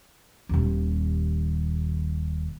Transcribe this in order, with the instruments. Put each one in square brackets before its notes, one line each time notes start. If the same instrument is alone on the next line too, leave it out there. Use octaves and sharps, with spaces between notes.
[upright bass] D#1 D#2